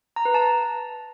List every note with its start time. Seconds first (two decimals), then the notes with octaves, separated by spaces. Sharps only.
0.16 A#5
0.25 B4
0.34 A5